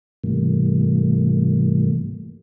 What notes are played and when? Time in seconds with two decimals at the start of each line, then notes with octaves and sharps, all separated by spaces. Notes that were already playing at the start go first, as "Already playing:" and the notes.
0.24 G#2 C3 E3 G3 A3 A#3